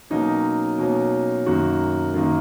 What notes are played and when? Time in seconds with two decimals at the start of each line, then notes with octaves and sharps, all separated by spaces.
0.10 B2 F#3 A#3 C#4 D#4
0.78 B2 F#3 A#3 C#4
1.46 F#2 D#3 A#3 F#4
2.14 F#2 D#3 A#3